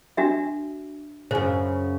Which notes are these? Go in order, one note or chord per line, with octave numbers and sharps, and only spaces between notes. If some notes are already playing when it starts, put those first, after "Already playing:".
D4 F#4 E5
F#2 C#3 C5